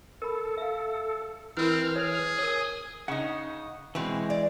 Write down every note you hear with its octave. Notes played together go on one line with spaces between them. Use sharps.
A4 A#4 B5
E5 F5
E3 C4 E4 F4 A#4 F6
G#4 C#5
A#4 C#5 G#5 D#6
C#3 D#4 F#5 C#6 D#6
B2 E3 G#3 C4
D5